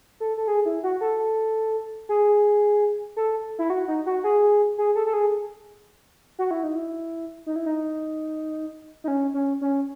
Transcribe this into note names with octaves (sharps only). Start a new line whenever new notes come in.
A4
A4
G#4
E4
F#4
A4
G#4
A4
E4
F#4
D#4
F#4
G#4
G#4
A4
A4
G#4
F#4
E4
D#4
E4
D#4
E4
D#4
D#4
C#4
C#4
C#4